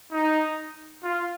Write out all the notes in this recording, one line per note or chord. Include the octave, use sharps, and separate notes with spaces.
D#4
F4